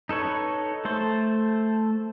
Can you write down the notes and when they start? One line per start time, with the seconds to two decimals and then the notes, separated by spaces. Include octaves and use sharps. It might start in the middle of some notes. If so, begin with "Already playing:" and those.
0.09 D#4 A4 B4 C#5
0.85 A3 A4 C5